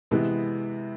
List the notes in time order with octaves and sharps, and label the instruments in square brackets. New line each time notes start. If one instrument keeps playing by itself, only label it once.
[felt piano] C3 E3 G#3 B3 E4